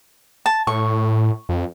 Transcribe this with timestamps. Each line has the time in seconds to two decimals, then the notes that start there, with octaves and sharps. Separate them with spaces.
0.46 A5
0.67 A2 C#6
1.49 F2